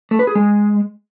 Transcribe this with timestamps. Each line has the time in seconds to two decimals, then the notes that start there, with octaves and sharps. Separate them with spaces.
0.11 A3
0.19 B4
0.27 G#4
0.35 G#3